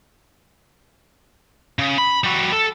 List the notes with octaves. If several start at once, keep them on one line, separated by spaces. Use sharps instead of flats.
C#3
B5
G3 F#4
A4